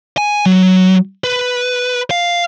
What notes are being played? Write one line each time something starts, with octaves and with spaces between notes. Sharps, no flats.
G#5
F#3
B4
F5